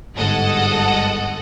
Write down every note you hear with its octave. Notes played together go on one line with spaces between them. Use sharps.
G1 G#2 G#3 A4 D#5 F#5